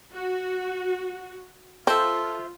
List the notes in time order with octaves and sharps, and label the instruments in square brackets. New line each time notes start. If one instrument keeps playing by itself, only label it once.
[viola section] F#4
[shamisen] C4 [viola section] F4 [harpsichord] A4 [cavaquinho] C5 E5